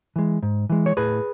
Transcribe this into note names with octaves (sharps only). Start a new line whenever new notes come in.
E3 G#3
G#2
E3 G#3
C#5
A2 G#4 B4